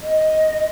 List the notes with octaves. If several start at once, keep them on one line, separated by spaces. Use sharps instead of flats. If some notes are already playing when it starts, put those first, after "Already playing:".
D#5